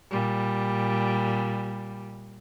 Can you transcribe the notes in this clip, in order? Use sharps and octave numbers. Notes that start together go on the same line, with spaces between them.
A#2 G3